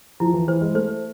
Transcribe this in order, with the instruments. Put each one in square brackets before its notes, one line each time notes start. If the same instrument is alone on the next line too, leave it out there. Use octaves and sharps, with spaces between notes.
[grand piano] F3 [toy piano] E4
[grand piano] E3
[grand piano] E3 [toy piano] C5
[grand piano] G#3
[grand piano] A3 [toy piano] C5